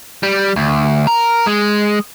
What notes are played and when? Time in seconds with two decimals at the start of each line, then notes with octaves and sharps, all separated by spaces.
0.23 G3
0.56 D2
1.07 A#4
1.47 G#3